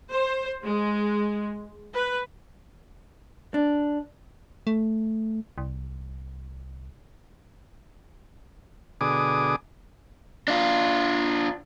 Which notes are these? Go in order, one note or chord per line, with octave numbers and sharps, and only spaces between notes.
C5
G#3
B4
D4
A3
C2
B2 D3 G#4 D6 D#6
D4 F4